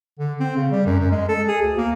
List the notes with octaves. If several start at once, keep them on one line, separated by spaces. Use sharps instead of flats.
D3
C4
C#3
G3
F#2
F#2
G#3
A4
G#4
D2
A#3